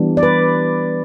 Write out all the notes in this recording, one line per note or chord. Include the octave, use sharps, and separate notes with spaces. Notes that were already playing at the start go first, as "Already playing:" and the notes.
Already playing: E3 G3 B3 D4
D5
B4